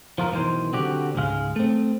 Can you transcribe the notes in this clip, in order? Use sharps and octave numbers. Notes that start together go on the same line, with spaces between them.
F3 F4 A#4
B1 A#2 D#3 E3 C5
D3 C4 F#4 G4
C#2 G#2 G#3 F5
A3 C4